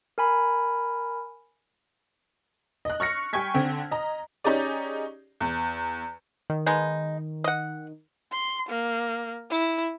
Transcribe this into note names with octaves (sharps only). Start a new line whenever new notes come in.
A#4 G#5 B5
D#5 F#6
C#6 F6 A#6 C#7
G3 G5 G#5 C#6 G#6 B6
D3 C4
D#5 A#5
C#4 D#4 G4 G#4 D5
E2
D#3
G#3 B3 D#4
D#5 F#5
C6
A#3
E4